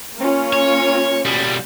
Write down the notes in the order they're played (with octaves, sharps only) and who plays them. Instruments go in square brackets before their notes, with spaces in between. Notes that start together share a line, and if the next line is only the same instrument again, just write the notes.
[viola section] A#3 C#4 F4
[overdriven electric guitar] C#5
B2 G3